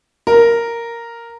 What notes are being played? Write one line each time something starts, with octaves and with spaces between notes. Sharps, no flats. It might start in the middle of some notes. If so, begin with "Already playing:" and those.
A#4